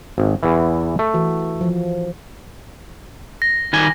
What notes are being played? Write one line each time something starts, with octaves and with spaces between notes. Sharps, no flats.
G#1
E2 E3
A3
E3 F#4
F3
A#6
D#3 G3 G#5